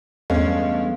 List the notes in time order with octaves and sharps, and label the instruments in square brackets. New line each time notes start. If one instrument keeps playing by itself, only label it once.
[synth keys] E2 G2 [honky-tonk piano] G#3 A3 C#4 [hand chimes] B3 F5